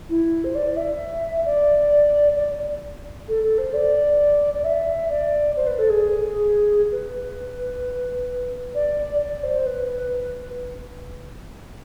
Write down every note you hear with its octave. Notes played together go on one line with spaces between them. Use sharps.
E4
C5
D5
E5
D5
D5
A4
A4
C5
D5
D5
E5
D5
C5
B4
A4
G#4
B4
D5
D5
C5
B4